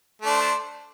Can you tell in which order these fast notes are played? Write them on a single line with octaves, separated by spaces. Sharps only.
A3 D4 C5